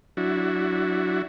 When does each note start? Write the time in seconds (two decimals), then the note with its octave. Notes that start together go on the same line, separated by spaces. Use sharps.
0.17 F#3 D4 E4 F#4